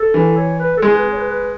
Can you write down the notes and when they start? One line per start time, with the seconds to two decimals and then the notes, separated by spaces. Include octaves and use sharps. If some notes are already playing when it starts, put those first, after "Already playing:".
Already playing: A4
0.14 E3
0.37 C#5
0.60 B4
0.77 A4
0.82 G#3 G#4
0.94 B4
1.13 C#5
1.17 B4
1.28 B4